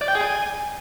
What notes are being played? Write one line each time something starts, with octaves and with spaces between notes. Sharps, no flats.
D5
G5
G#4
G#5